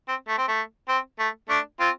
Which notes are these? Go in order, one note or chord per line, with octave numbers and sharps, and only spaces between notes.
C4
A3
C4
A3
C4
A3
A3 D4
C4 F4